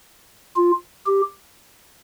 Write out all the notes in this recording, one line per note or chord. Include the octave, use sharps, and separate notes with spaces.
F4
G4